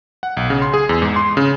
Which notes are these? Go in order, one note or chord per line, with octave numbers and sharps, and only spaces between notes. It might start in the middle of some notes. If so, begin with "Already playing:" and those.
F#5
B1
C#3
C6
G#4
E2
G#2
C6
C#3